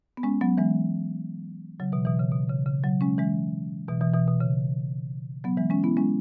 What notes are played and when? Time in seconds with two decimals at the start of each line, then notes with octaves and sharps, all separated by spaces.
0.17 B3
0.23 G#3 C#4
0.41 F#3 B3
0.58 E3 G#3
1.80 C#3 F#3
1.92 B2 E3
2.05 B2 E3
2.19 C#3
2.32 B2
2.50 C#3
2.66 C#3
2.84 C#3 F#3
3.01 G#3 C#4
3.18 E3 G#3
3.88 B2 E3
4.01 B2 E3
4.14 B2 E3
4.28 B2
4.40 C#3
5.44 F#3 B3
5.57 E3 G#3
5.70 G#3 C#4
5.83 B3 E4
5.97 G#3 C#4